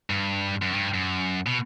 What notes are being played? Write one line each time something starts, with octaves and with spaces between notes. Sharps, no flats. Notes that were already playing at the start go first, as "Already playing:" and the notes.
G2
F#2
G2
F#2
B2